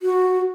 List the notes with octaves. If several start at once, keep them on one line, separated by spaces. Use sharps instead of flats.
F#4